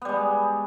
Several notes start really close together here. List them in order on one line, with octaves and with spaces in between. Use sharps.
B3 G3 G#3